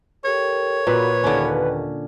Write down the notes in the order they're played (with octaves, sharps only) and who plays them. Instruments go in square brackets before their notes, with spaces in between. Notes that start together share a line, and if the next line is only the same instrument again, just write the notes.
[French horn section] G4 A4 A#4 [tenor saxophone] C#5
[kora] A#2 [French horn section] F#4 A#4 [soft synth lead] B4
[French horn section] D#2 [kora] D3 C#4